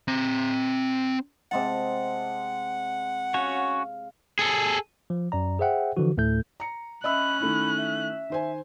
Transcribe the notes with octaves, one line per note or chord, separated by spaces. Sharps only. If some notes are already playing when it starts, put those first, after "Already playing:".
C4 A#5
C3 G#3 F#5 A5
C#4 F#4 C#5 F5
G#4 A4
F3
F#2 D5 A#5
G#4 C5 E5 F#5 G5
D3 E3 F3 F#4
D2 A2 A3 A4 G6
A#5 C#7
C#4 D#5 E5 B5 E6 F#6
D#3 A3 E4 B5
E5
D#3 C5 G#5